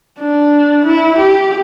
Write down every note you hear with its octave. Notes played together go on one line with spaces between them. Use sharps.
D4
E4
G4